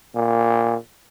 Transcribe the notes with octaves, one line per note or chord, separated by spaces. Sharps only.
A#2